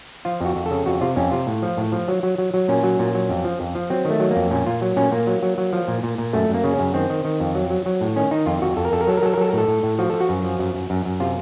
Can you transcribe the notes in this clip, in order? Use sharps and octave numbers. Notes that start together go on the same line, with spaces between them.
F3 F4
F2 F#4
F2
A4
C#3
F2 F#4
C3 F4
F2 C#4
C3 F4
A2
F3
A2
F3
F#3
F#3
F#3
F#3
A#2 C#4
F#3
A#2
F#3
F2
F3
F2
F3
F#3 C4
D#3
A3
F#3
F2 A#3
A#2 C#4
A#2 F4
F#3
A#2 C#4
A#2 A#3
F#3
F#3
F#3
F3
A#2
A#2
A#2
F#2 A3
F#2
A#3
C#3
C#4
F#2
D#3 C4
D#3
D#3
F2
F#3
F#3
F#3
A2
D#3 C#4
D#3 D#4
F2 F4
F2 F#4
F2 A4
A#4
F2 A4
A#4
F#3 A4
A#4
F#3 A4
A#4
F#3 A4
A#4
A2 A4
A2
A2
F3 F#4
F3 A4
F#4
F#2
F3
F#2
F#2
F#2
F#2
C3 F4